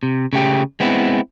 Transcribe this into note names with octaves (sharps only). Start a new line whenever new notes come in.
C3
C#3 A3 G4
G#3 B3 C4 E4